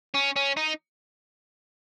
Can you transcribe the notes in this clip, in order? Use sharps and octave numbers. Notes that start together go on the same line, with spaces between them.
C#4
C#4
D#4